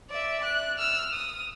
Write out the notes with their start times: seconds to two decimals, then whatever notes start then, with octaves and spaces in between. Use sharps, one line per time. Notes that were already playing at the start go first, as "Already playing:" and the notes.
0.10 D5 E5
0.44 F#6
0.78 E6 F6
1.14 D#6